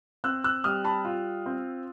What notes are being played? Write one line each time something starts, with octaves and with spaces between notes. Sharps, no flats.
C4 E6 F#6
E6 F#6
G3 D#6 F6
A5 B5
F4
C4